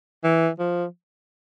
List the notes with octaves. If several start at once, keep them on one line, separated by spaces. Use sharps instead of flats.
E3
F3